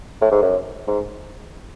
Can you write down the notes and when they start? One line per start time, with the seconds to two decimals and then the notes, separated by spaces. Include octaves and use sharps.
0.21 A2
0.31 G#2
0.42 F#2
0.88 G#2